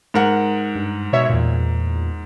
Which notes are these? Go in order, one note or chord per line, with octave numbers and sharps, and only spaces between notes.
G#2 A#4 F#5
G2
B2 C#5 E5
E2 A#2